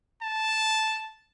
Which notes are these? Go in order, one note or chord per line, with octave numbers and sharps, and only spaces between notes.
A5